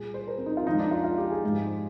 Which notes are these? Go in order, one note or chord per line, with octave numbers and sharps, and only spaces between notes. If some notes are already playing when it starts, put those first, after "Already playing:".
Already playing: A#2 G3 G#4
C5
A#4
C4
D#4
F4
F2 D#3 G#3 D#4
D4
F4
F4
G4
G#4
G#2 F3 G#3